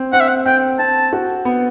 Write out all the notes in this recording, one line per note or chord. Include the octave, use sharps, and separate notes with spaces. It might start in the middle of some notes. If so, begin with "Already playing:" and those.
Already playing: C4
C4 F#5
E5
F#5
C4 G5
C4 A5
F#4
B3